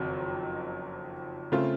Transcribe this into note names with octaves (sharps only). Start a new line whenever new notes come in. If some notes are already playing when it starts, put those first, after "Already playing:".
Already playing: F#1 F2 D#3 F#3 C4
C#3 A3 C4 F4